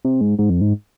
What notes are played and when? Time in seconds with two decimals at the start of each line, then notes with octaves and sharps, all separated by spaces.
0.05 C3
0.21 G#2
0.39 G#2
0.50 F2
0.61 G#2